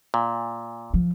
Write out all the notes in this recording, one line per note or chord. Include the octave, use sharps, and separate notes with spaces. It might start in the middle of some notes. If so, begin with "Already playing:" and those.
A#2
F3